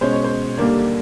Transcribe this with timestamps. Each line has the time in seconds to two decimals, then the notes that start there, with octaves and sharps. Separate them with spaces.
0.01 B2 G#3 C#4 C5
0.13 C#5
0.24 C5
0.58 D#2 D3 G3 A#3 D4